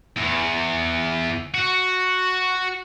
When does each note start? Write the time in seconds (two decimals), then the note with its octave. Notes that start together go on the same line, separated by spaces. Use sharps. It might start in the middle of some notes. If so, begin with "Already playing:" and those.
0.17 E2
1.54 F#4